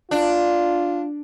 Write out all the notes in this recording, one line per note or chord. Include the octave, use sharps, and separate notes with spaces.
D4 F4